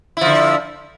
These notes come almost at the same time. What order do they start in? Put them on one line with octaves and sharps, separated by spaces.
E4 F3 D3